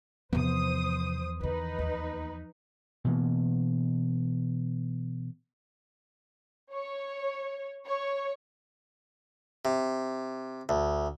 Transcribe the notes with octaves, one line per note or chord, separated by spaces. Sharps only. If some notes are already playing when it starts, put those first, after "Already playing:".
E2 C3 F3 B3 D#4 C5 D#6
D#3 E3 D#4 B4
D#2 A#3
B2 E3 A#3
C#5
C#5
C3
D2